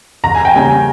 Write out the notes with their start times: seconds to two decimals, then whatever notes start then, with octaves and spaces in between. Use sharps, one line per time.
0.24 E2 A#5
0.35 G#5
0.45 G5
0.54 C#3 G3 A#3 G#5